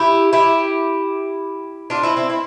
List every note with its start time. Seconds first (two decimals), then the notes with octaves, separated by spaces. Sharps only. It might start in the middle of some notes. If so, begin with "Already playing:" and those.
Already playing: E4 G4
0.33 E4 G4
1.90 D4 F4
2.03 C4 E4
2.17 C4 E4
2.30 C4 E4